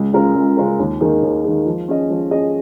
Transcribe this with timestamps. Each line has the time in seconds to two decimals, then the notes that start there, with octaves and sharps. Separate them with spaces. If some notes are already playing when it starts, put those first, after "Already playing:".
Already playing: C#2
0.13 C#3 G#3 F4 A#4
0.35 C#2
0.57 C#3 G#3 F4 A#4
0.79 D#2
1.01 D#3 A#3 D#4 G#4
1.23 D#2
1.44 D#3 A#3 D#4 G#4
1.66 F3
1.88 C#4 G#4 D#5
2.10 F3
2.31 C#4 G#4 D#5